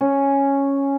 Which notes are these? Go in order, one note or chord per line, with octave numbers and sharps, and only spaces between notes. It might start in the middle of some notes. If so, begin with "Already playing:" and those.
C#4